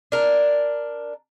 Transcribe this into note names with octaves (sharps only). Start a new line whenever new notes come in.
D4 A#4